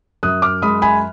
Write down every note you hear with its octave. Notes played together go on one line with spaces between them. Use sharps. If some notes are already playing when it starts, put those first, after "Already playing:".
F#2 D#6 F#6
D6 F6
G#3 B5 D#6
G#5 B5